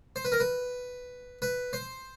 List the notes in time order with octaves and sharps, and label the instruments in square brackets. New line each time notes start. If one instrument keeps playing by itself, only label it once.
[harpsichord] C5
B4
A#4
B4
B4
C5